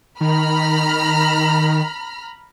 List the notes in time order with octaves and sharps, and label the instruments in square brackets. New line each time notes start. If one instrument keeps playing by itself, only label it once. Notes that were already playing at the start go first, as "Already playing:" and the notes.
[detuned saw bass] D#3 [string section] A#5 B5 F6